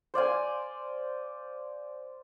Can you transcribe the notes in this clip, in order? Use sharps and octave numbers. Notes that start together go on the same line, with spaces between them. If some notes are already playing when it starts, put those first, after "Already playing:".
C5 D5 F5 G#5